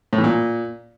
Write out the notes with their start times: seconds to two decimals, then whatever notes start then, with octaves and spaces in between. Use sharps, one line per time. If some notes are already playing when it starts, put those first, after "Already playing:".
0.13 A2
0.18 E3
0.24 A#2